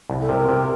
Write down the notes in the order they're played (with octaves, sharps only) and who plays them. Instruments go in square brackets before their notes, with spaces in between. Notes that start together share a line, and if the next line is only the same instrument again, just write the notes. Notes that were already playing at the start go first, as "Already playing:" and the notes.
[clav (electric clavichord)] C2
[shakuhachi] A4
[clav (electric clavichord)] C3 [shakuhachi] A#4
[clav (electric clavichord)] C3